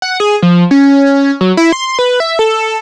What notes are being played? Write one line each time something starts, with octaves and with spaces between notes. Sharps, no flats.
F#5
G#4
F3
C#4
F#3
E4
C6
B4
E5
A4